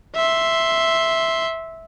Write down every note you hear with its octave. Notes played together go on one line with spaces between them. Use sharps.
E5 C6